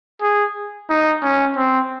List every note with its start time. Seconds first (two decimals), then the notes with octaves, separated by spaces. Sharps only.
0.22 G#4
0.90 D#4
1.23 C#4
1.57 C4